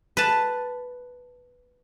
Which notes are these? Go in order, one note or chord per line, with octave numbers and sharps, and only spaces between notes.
B4 A5